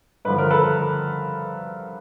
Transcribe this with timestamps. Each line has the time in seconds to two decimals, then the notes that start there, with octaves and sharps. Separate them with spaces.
0.25 G2 D3 F3 B4
0.38 A#4
0.50 A4 B4